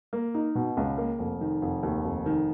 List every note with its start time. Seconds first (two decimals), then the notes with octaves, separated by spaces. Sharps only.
0.13 A#3
0.35 D#4
0.55 B2
0.77 C#2
0.98 A#3
1.19 F1
1.41 D#3
1.62 F1
1.83 D#2
2.04 F1
2.26 D#3